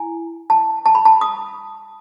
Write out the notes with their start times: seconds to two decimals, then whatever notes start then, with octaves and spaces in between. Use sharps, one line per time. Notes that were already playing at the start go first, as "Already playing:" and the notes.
Already playing: E4 G#5
0.50 A5
0.86 A5
0.95 B5
1.05 A5
1.21 D#6